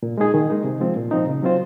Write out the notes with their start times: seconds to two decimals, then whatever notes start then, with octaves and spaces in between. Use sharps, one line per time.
0.03 A#2
0.18 G#3 D#4 G#4
0.34 D#3
0.50 G#3 D#4
0.64 C3
0.80 F3 G#3 C4 F4
0.97 A#2
1.11 F3 C4 D#4
1.27 C#3
1.42 F#3 C4 F4 C5